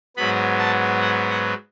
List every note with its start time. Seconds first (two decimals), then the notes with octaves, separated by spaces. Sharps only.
0.17 G#2 F#3 B3 B5
0.59 A5
1.02 F#5
1.31 F#5